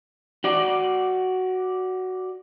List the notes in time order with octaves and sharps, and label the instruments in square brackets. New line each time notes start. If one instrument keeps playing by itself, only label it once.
[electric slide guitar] F#4 D5